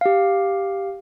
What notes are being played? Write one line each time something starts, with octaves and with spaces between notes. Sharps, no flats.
G4 F5